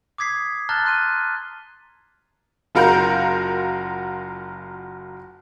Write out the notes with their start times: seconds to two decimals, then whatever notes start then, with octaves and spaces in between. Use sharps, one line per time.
0.18 D6 D#6 G#6 B6 C7
0.69 A5 A#5 F6 F#6 A6 G7
0.85 C6 F#6 D#7
2.75 F#1 F4 F#4 A#4 A#5 G6